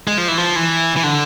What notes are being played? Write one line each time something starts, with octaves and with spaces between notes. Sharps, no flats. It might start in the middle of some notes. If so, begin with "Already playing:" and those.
G#3
F3
E3
F3
E3
E3
D3